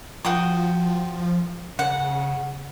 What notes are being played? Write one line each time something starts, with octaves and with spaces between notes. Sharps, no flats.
F3 F#4 G5 D#6
C#3 F#5